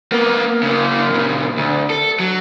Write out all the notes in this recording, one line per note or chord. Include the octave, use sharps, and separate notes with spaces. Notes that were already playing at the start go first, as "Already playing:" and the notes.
A#3 B3
C#3 A#3
A#2 C#3
D2
A4
F#3